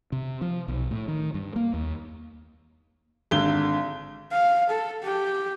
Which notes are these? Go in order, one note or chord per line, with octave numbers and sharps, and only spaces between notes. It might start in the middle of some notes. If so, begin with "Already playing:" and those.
C3
F3
B1
A2
D#3
G2
A#3
D#2
G#1 D3 G7
F5
A4
G4